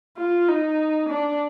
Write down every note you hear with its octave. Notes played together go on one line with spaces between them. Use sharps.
F4
D#4
D4